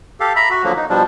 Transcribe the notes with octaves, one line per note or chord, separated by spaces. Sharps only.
G4 A4 F5
E5 A#5 B5
F#4
D3 F3 F#3 A#3
D#4
B2 F3 G3 D4